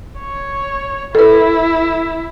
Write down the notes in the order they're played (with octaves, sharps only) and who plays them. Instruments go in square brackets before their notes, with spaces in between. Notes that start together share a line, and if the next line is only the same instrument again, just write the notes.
[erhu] C#5
[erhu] E4 [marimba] A4 B4